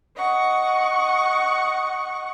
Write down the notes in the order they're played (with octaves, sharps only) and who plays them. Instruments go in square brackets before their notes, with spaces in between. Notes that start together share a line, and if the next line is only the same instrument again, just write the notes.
[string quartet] D#5 F#5 C#6